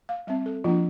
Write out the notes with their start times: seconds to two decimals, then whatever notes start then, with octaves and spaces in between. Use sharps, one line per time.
0.09 F5
0.27 G3 C4 E5
0.46 A4
0.64 F3 A#3 D4 F4